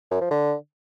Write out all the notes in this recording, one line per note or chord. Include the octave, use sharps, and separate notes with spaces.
F#2
F3
D3